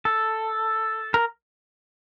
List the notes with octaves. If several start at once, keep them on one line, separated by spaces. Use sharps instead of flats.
A4
A#4